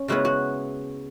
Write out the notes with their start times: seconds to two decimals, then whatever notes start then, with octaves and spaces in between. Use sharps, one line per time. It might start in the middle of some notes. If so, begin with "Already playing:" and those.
Already playing: C#4
0.08 C#3 G#3 B3 E4 F#4
0.25 F#4